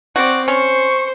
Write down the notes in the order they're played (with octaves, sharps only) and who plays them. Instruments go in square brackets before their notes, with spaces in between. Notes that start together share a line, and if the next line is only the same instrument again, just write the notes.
[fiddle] C4 D5 [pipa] F#4
[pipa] C#4 [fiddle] C5 [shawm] C#6